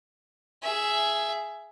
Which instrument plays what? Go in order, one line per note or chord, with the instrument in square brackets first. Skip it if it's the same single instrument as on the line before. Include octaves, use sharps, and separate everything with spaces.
[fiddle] G#4 E5